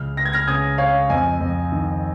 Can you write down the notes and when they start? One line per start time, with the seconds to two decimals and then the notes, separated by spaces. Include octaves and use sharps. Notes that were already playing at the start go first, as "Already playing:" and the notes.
Already playing: C#2 F6
0.17 C#2 A#6
0.25 G#6
0.33 F6 A#6
0.47 C#3 D#6 G#6
0.78 C#3 C#5 F5
1.10 F2 D#5 G#5
1.40 F2
1.72 D#3